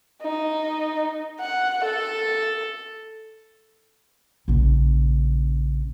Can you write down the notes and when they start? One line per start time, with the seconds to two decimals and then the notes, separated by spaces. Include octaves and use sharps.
0.23 D#4
1.40 F#5
1.85 A4
4.48 A#1 C#3